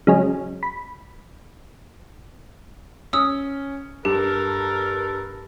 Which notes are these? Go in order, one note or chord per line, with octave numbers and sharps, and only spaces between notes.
C#3 F#3 G#3 C#4
B5
C#4 D#6 E6
G2 G4 A4 A#4